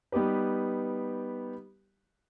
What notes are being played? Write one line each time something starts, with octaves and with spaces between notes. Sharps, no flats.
G3 B3 D#4 G4 B4